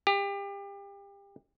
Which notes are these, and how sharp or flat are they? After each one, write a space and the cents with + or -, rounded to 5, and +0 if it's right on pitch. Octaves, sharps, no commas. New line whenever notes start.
G4 +30